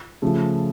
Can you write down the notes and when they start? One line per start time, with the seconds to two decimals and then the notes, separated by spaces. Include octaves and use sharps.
0.22 C#3 F3 A3